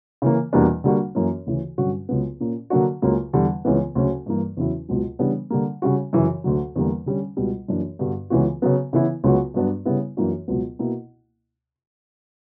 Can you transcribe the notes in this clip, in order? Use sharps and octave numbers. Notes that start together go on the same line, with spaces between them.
C#3 E3 A#3
E2 B2 G3 A#3 D4
D3 G3 A#3 D4 F#4
F#2 E3 A#3 C#4
D2 C#3 E3
G2 D3 F#3 C#4 F#4
C#2 C#3 F#3 B3
A#2 A#3 C#4
D3 F#3 A#3 D4 F#4
C#2 C#3 F#3 A#3
E2 D3 G3
C#2 C#3 E3 B3
D2 C#3 F#3 C#4
G2 E3 A#3
E2 C#3 F#3 C#4 E4
C#2 B2 F#3
C#3 E3 G3 B3 D4
D3 G3 A#3
C#3 G3 C#4 F#4
F#2 C#3 E3
D2 D3 F#3
E2 D3 G3 A#3
D3 G3 C#4
C#2 B2 G3
F#2 E3 A#3 D4
G2 D3 G3 B3 F#4
C#2 C#3 E3 B3 F#4
C#3 F#3 B3
C#3 E3 B3 E4
C#2 C#3 F#3 B3 F#4
G2 F#3 B3 D4
C#3 G3 B3 E4
F#2 E3 A#3 D4 F#4
C#2 B2 F#3 B3
B2 A#3 E4